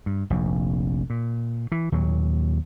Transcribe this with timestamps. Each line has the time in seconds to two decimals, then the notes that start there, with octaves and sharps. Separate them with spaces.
0.06 G2
0.30 F1 A#1 F2
1.10 A#2
1.72 E3
1.92 D#2 A#2 F#3